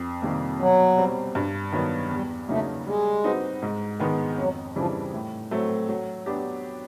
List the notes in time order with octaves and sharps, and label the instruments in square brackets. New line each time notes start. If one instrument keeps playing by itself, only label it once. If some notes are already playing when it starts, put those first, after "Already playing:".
Already playing: [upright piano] F2
C3 D#3 G3 A#3
[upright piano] B2 [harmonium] F#3
[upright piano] G3 C4
G2
D#3 F#3 B3
[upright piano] E2 [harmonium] G3
[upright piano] C#3 F#3 A#3 D#4 [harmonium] A3
[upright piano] G3 [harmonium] G#3
[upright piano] C4 D#4 F#4 B4
G#2
D#3 G#3 B3
[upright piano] F2 [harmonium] F#3
[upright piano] C#3 E3 G3 C4 [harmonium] F3
[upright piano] A2
F#3 A3 C4
F#3
B3 D4 G4